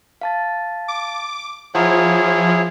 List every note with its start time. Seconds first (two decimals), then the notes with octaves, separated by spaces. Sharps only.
0.21 F5 A5 A6
0.88 D6
1.75 F3 E4 G#4 C#5 F#5 A#5 F6